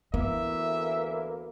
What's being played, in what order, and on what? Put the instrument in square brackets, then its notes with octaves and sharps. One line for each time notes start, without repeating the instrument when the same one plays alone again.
[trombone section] D2 E3 [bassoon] A#3 [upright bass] B3 [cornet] E5